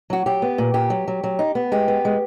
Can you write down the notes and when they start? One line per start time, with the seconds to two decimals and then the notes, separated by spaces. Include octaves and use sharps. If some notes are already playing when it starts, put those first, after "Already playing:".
0.10 F#3 F#4
0.26 F#3 G4
0.42 B3
0.58 A#2
0.74 A#2 G4
0.90 F#3
1.07 F#3
1.23 F#3
1.39 D#4
1.55 B3
1.72 G#3 G4
1.88 B3
2.05 G#3